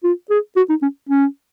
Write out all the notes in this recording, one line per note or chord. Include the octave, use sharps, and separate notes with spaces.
F4
G#4
F#4
D#4
C#4
C#4